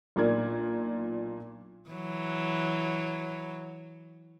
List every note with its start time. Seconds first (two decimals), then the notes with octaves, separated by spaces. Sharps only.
0.16 B1 A#2 D4 A#4 G#6
1.90 E3 F#3